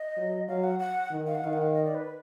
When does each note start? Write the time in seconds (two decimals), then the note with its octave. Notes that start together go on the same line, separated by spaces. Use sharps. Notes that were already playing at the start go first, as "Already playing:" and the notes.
Already playing: D#5
0.17 F#3
0.48 F#3 F5
0.64 F#5
0.79 F#5
1.11 D#3
1.27 F5
1.35 F#5
1.43 D#3 F5
1.53 F#5
1.62 F5
1.74 D#5
1.84 D5
1.95 B4
2.05 B4